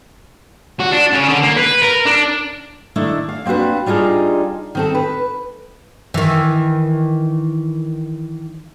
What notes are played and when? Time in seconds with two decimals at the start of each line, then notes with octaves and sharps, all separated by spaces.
0.80 F#4
0.92 D4
1.12 C#3
1.28 D3
1.43 A#3
1.56 B4
1.82 A#4
2.06 D4
2.96 D#3 A3 D4 E4
3.29 F5
3.45 A#3 C4 D4 F#4 B4
3.86 G3 D4 D#4 F4 G#4
4.75 D#3 C4 A4
4.95 B4
6.14 D#3 E3